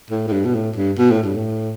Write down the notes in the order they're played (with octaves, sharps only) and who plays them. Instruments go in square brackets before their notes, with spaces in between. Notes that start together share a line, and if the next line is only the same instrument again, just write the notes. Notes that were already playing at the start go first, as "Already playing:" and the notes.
[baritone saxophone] A2
A2
G2
B2
A2
G2
B2
A2
G2
A2